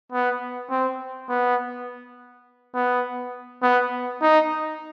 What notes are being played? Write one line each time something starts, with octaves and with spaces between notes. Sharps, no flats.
B3
C4
B3
B3
B3
D#4